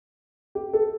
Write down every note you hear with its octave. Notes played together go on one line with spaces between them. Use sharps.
G4
A4